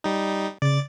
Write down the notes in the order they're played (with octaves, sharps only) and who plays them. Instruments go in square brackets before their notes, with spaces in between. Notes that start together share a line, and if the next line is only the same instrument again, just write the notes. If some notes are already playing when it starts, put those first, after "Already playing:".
[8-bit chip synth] G3 D#4
[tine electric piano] C#3 [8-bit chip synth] D5 A6